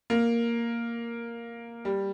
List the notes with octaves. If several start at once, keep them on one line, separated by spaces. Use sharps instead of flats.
A#3
G3